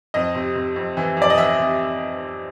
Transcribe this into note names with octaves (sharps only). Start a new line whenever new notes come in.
F2 D#5
C3
C3
F2
E3
F2 D5
D#5
E3 E5
C3